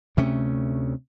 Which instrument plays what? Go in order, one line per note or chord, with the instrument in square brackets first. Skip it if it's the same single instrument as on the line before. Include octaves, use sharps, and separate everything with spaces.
[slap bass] D2 C3 A3 C#4